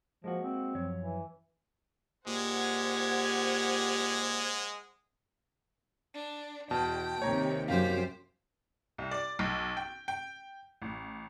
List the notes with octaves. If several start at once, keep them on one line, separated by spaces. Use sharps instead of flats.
F3 G#3 A#3 F#4
C4
F#2 F3 C#5
E3
A#2 G#3 G4 C5 F#5 G#6
D4
E2 B2 G5 A5
D#2 C3 C#5 A#5
F#2 G4 C5 F5
C2
D5
B1
G5
G5
A1